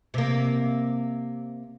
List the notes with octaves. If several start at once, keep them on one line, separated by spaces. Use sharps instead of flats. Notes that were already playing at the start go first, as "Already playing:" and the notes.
C3 A#3